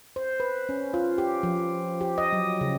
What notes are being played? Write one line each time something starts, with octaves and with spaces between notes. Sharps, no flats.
C5
B4
C#4
F4
G4
F3
G4
D#5
F#3
C#3